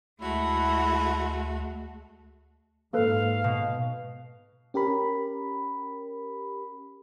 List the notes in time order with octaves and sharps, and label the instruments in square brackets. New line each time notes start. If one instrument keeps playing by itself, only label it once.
[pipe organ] D2 [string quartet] G#3 A3 F#4 [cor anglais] E4
[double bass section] G#2 [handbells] A#3 A4 B4 [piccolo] F5
[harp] B2
[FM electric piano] C#4 G4 A#4 B5